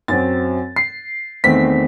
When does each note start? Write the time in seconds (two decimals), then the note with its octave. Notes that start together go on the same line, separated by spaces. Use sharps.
0.08 F#2 F#3 C4 A6
0.76 C7
1.44 E2 D#3 A3 C4 B6